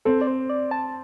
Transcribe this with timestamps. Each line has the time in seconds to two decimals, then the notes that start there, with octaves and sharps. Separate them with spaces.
0.05 C4 A4
0.21 D5
0.27 C5
0.50 D5
0.71 A5